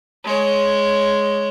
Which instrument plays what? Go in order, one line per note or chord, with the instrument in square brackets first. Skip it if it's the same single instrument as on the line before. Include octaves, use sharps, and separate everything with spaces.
[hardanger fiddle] G#3 C#5